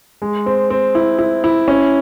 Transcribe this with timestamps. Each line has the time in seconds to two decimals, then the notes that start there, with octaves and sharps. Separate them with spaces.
0.22 G#3
0.46 C4
0.70 C4
0.95 E4
1.19 E4
1.44 E4
1.68 C#4